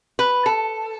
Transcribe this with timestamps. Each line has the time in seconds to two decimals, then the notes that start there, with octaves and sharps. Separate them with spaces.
0.19 B4
0.46 A4